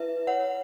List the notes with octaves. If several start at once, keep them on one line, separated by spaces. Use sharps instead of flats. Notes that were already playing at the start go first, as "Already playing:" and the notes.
Already playing: E4 B4 E5
C#5 F#5